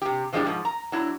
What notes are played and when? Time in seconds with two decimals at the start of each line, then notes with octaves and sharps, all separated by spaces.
0.02 C3 G4
0.33 E3 F3 G#3 B3 D4 G4
0.45 G#2 D#3 F3
0.65 A#5
0.92 F#3 D4 E4